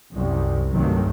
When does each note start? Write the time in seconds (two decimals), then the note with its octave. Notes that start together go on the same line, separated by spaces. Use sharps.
0.11 C2 F#2
0.71 D2 G2 C3 D#3 F#3